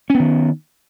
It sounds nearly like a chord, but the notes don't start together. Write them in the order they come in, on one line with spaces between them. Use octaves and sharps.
C#4 B3 D#3